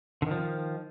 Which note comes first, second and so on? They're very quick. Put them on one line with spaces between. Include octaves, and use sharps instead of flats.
D3 D#3 F3